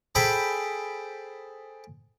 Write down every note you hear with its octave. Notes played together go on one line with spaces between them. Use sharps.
G#4 A4 C5 G5 B5